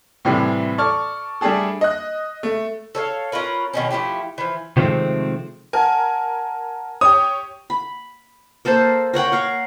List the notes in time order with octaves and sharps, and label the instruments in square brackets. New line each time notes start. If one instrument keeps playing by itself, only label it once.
[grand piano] A2 C3 E3 G3
A4 D5 C#6 F6
G3 A3 D4 G#4 A4
D#5 F#6
A3
[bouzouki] A4 C#5 F5
C#4 F4 A#4 B4
B2 D#3 C#4
F3 A3 E4 G4
E3 F3
[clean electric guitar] C3 D#3 F3 G#3 A3 C4
[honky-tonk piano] A#4 G#5 [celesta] F#5 A5
[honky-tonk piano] G4 C#5 [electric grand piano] D#6
[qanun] B5
A#3 A4 A#4 C5
A#4 C#5 F#5 G5
A#4 F5 F#5 C#6